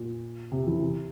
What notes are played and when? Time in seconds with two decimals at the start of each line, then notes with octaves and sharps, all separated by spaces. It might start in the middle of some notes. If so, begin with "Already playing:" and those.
Already playing: A#2
0.52 C3
0.67 E3
0.81 C3